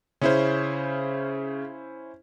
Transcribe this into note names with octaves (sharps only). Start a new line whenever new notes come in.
C#3 C#4 E4 C5